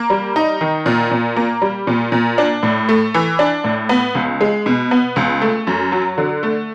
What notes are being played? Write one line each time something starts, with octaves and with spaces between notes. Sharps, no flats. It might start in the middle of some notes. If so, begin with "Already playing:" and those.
Already playing: A#3
G3
D#4
D#3
A#2
A#2
A#3
G3
A#2
A#2
D4
A2
A3
E3
D4
A2
B3
C#2
G#3
B2
B3
C#2
A3
F#2
F#3
D3
A3